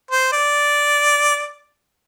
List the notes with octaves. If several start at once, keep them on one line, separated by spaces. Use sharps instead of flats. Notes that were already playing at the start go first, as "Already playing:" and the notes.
C5
D5